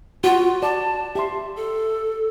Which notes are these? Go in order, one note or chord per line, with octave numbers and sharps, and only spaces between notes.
F4 F#4 C#6
D5 A5
G4 E5 C6
A4